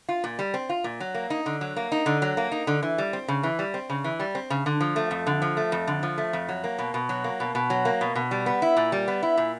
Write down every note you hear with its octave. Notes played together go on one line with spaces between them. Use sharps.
F4
A#2
G3
C4
F4
A#2
F#3
A#3
D#4
D3
F#3
A#3
D#4
D3
F#3
A#3
D#4
D3
E3
G3
C4
C#3
E3
G3
C4
C#3
E3
G3
C4
C#3
D3
F3
A3
F2
D3
F3
A3
F2
D3
F3
A3
F2
F#3
A#3
B2
B2
F#3
A#3
B2
B2
F#3
A#3
B2
B2
G3
B3
E4
A#2
G3
B3
E4
A#2